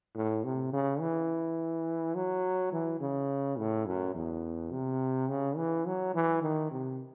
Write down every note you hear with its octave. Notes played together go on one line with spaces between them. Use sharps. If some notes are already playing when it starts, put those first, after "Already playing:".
A2
C3
C#3
E3
F#3
E3
C#3
A2
F#2
E2
C3
C#3
E3
F#3
E3
D#3
C3